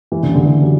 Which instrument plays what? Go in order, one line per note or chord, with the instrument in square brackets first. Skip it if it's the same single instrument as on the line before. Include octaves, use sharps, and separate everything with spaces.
[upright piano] E3
D3
C#3
D3
E3
F#3